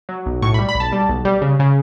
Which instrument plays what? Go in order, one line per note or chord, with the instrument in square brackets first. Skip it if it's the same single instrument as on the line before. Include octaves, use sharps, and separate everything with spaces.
[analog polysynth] F#3
B1
A2 C#6
B5
G3
B5
B1
A5
G3
B1
G3
C#3
C#3